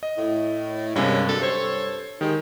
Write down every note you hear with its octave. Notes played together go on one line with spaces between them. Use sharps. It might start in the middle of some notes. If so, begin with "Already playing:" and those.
D#5
A2
G2 C3 G#3 A#3 C#4
F#2 D3 A4
G2 A4 C5 C#5
D#3 G#3 D#4 G4